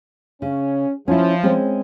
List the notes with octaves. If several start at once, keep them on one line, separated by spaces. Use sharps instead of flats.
C#3 C#4
F3 C#4 E4
G#3 C4 C#4